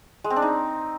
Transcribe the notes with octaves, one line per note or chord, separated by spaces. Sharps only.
G#3
C4
D4
D#4